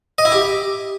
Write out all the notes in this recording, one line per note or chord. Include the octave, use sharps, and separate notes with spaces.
D#5
E4
G4